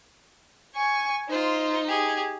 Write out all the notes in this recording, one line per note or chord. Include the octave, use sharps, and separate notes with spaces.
G#5 C#6
D#4 F4 C5
G4 G#4